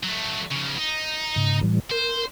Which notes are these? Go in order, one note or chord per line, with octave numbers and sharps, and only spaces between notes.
F#3 A3
C#3 F3
D#4
G#2 C#3
A2 E3 G3
A#4 C5